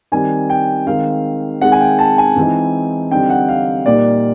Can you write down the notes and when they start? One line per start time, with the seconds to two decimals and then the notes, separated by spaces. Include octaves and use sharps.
0.12 D#3 G3 C4 G#5
0.50 G5
0.86 D#3 G#3 C4 D#4 F5
1.61 D#3 G#3 C4 F#5
1.72 G#5
1.80 G5
1.99 A5
2.18 G#5
2.36 E3 G#3 C4 D#4
3.11 D3 G3 C4 D#4 G5
3.30 F#5
3.48 F5
3.86 A#2 G3 A#3 D#4 D5